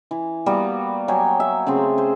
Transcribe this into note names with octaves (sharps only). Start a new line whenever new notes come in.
E3
G3 A#3 B3 F#4
F#3 C#5 G5 G#5
E5
C#3 A3 C4 G#4
C5